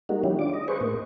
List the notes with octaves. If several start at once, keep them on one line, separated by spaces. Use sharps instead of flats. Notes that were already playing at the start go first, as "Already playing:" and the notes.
G3 G#3 A#3 D#4 F#4
D#3 F#3 C#4 E4 G4
D4 F4 D6
D#5
G#4 B4 C5 C#6
A2 A#3